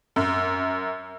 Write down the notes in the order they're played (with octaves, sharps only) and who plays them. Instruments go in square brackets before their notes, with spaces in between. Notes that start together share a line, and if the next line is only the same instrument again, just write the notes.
[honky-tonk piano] F#2